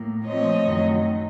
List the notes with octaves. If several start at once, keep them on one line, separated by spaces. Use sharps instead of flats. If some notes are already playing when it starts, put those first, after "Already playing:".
Already playing: A2 A#3
A#2 F3 A3 C4 C#5 D#5
F#2 D#3 F#3 A3